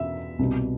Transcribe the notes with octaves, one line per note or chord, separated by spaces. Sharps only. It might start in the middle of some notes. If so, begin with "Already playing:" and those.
Already playing: E2 B2 E5
C2 B2